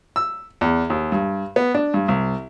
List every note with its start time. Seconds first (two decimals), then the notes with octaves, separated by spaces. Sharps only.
0.16 E6
0.61 E2
0.90 D#2
1.12 G2
1.56 B3
1.75 D4
1.94 G2
2.08 C2